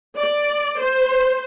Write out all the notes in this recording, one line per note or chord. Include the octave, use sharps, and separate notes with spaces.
D5
C5